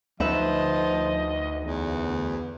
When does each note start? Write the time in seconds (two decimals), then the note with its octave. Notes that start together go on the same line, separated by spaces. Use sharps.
0.20 D2 F3 D#4 B4 D#5 E5
1.65 E2